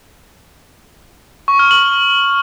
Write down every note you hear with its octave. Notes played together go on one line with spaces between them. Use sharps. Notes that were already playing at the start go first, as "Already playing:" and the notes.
C#6
F6
F#7